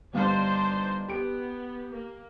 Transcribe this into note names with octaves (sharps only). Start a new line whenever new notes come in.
G1 G3 D4 D#4 C5 F5
B3 G4 D7
A#3